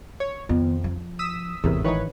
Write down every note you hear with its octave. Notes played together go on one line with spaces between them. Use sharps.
C#5
F2 D#3 B3
F3
D#6 E6 B6
G#1 E2 A2 C3 A#4
D#3 E3 D#4 B4 C#5